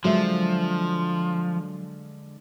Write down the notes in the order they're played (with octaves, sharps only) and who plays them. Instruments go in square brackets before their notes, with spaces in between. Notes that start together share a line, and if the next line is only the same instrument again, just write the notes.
[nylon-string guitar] D3 G#3 E5 [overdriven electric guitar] F3 [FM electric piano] F#3